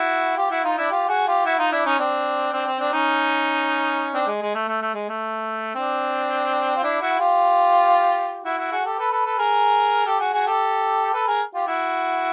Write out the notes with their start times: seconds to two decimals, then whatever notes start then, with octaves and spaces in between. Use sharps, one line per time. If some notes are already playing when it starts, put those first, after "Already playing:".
Already playing: E4 F#4
0.37 F4 G4
0.51 E4 F#4
0.64 D#4 F4
0.78 D4 E4
0.91 F4 G4
1.09 F#4 G#4
1.27 F4 G4
1.45 E4 F#4
1.59 D#4 F4
1.72 D4 E4
1.86 C#4 D#4
1.99 C4 D4
2.53 C4 D4
2.67 C4
2.79 C4 D4
2.93 C#4 D#4
4.14 C4 D4
4.27 G#3
4.42 G#3
4.55 A3
4.68 A3
4.82 A3
4.94 G#3
5.09 A3
5.75 C4 D4
6.77 F4
6.83 D4 E4
7.01 E4 F#4
7.19 F4 G4
8.45 E4 F#4
8.58 E4 F#4
8.72 F#4 G#4
8.85 G4 A4
8.99 A4 B4
9.11 A4 B4
9.25 A4 B4
9.39 G#4 A#4
10.06 G4 A4
10.20 F#4 G#4
10.33 F#4 G#4
10.47 G4 A4
11.14 A4 B4
11.27 G#4 A#4
11.54 F4 G4
11.68 E4 F#4